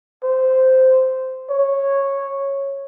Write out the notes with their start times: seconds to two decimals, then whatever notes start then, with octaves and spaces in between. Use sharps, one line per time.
0.24 C5
1.50 C#5